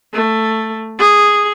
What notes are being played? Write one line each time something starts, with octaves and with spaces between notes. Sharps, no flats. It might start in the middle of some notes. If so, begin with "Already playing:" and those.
A3
G#4